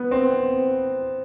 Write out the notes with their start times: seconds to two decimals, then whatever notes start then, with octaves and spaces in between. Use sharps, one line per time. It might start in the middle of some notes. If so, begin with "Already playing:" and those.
Already playing: B3
0.11 C4